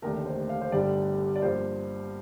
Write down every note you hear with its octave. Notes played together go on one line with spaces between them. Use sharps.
F1 D#2 D3 A3 A#4
C5
F5
C5
G1 G2 D3 G3 D5
D5
G2 F3 A#3 C5